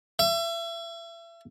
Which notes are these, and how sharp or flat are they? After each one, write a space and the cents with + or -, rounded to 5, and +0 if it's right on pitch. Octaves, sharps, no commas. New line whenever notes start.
E5 +35